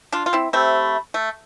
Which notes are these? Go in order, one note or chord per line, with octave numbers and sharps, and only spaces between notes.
D4 F4
F4
C4 E4
A3 C4 G4 C5 E5 B5
A3